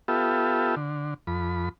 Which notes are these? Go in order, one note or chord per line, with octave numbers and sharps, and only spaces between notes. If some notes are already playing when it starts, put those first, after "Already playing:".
B3 F4 G4 A4 E5
D3
F2 B5